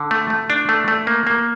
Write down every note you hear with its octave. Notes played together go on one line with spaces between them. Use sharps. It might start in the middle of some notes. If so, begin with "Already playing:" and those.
Already playing: D3
A3
A3
D4
A3
A3
A#3
A#3